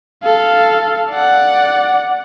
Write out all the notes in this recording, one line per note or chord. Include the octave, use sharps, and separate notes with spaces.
A4 F5
D5 F#5